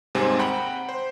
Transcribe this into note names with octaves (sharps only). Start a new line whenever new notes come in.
D#2 G#2 C3 G3 C4 G#5
F#5 G5 A#5 B5
C5